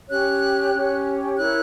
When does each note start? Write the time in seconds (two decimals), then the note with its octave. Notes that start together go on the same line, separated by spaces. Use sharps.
0.09 C#4 G4 C#5 F#6
0.73 C#4 G4 C#5
1.36 E4 A#4 C#5 F#6